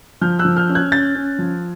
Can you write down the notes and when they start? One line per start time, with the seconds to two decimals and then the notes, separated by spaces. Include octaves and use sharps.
0.21 F3 F6 G6
0.39 E6 F#6
0.45 F3
0.56 F6 G6
0.69 C#4
0.75 F#6 G#6
0.92 C#4 G6 A6
1.15 C#4
1.39 F3